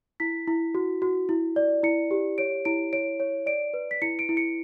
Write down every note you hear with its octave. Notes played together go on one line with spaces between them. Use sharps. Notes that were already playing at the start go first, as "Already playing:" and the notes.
E4 B6
E4
F#4
F#4
E4
D5
E4 C#7
G4
C#5 D7
E4 D7
C#5 D7
C#5
D5 D7
B4
B6
E4 C#7
D7
E4
C#7